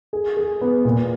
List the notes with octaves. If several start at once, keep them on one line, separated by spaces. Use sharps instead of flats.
G#4
G#4
B3
A#2